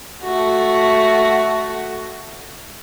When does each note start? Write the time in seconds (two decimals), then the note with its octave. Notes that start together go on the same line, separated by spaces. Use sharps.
0.23 A3 F#4